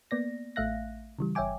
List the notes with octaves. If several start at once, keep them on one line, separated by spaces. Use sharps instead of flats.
A#3 B3 D5 A#6
A1 A3 E5 F5 F#6 A#6
C#3 E3 G3
G1 C#5 E5 G5 G#5 D6